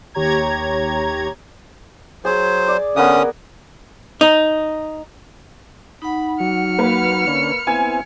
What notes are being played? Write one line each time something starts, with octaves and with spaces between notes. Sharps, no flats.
D#2 G4 C#5 A#5 G#6
F#3 G#4 C5
D5
D3 A#3 B3 C#4 A#4 D#6
D#4
D#4 F#5 B5
F#3 F6 C#7
A#3 B4
D3 C#4
B3 C4 E4 G#5 G#6